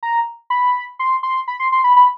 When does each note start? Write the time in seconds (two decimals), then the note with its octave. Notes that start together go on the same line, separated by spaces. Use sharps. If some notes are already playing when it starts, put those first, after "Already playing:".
0.03 A#5
0.50 B5
0.99 C6
1.23 C6
1.48 B5
1.60 C6
1.72 C6
1.84 B5
1.96 B5